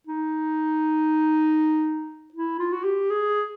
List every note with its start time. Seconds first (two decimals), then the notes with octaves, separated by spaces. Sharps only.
0.07 D#4
2.34 E4
2.60 F4
2.73 F#4
2.84 G4
3.10 G#4